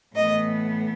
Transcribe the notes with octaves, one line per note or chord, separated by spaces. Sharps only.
A2 E3 B3 D#5